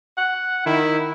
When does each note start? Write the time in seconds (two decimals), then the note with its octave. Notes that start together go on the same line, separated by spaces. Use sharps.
0.17 F#5
0.66 D#3 E4